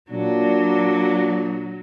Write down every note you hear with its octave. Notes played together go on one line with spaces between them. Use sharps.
A#2 F#3 D4